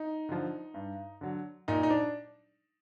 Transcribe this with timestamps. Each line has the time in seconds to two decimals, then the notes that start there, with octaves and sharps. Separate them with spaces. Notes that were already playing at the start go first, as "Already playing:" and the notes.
Already playing: D#4
0.29 D3 F3
0.74 G2
1.21 D3 F#3
1.68 A#2 D#4
1.83 D#4
1.90 D4